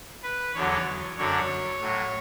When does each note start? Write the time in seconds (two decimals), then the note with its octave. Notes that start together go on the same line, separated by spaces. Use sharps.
0.23 B4
0.55 E2 D3 F#3 C#5
1.17 F#2 D3 F#3 C#5
1.80 A2 F#3